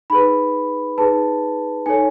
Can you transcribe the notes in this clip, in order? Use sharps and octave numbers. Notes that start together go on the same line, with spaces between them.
D#4 G#4 B4 B5
D#4 G#4 B4 A5
D#4 A4 C#5 G#5